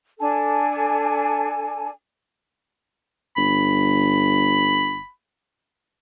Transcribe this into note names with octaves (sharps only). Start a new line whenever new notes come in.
D4 A4 G#5 A5
G1 B5